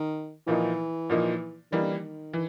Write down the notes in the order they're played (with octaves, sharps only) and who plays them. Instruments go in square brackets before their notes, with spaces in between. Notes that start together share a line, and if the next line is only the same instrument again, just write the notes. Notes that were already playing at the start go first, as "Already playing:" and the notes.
Already playing: [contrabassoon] D#3
[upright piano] A#2 F3 A#3 D#4 [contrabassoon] E3
[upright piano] A#2 F3 A#3 D#4
[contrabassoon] D#3 [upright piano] E3 G3 A#3 D#4
[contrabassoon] D3
D#3
[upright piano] E3